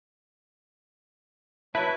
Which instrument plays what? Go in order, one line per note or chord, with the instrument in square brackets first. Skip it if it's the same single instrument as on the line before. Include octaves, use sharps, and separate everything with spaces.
[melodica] F#3 A5 [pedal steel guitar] E4 [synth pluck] B4 [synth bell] E5 B6